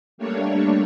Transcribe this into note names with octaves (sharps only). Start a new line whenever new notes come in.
G3 A3 A#3 D4 C#5